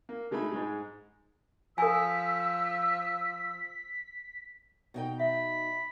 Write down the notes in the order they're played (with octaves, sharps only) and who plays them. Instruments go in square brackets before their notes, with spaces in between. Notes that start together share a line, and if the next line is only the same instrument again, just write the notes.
[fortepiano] A#3
D3 G#3 A3 D#4 B5
G#2 G#3
[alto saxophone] F3 [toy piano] A4 G#5 [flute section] E6 [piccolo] B6
[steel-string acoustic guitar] B2 D#4 G5
[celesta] E5 [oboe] B5